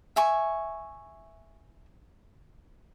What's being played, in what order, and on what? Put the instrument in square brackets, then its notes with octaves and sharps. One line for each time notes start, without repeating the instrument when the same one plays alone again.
[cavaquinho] E5 G#5 C#6